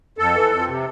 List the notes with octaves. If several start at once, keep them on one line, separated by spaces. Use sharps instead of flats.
F2 A4
E3
F2
C3